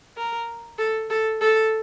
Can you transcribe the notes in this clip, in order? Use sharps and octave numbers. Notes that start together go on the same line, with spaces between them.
A#4
A4
A4
A4